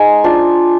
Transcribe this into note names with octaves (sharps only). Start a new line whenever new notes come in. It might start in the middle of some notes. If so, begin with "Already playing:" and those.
Already playing: G#3 D#4 G#5
D4 F4